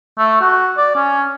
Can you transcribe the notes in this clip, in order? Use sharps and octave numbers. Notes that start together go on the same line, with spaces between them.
A3
F#4
D5
C#4